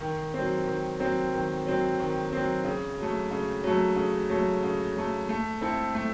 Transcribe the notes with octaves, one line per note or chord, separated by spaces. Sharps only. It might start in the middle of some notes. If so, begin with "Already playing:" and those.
D#3
F#3 C4
D#3
F#3 C4
D#3
F#3 C4
D#3
F#3 C4
C#3
F#3 A3
C#3
F#3 A3
C#3
F#3 A3
C#3
F#3 A3
A3
C4 E4 A4
A3